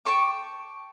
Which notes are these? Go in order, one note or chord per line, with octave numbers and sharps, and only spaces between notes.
G5 A5 C#6 D6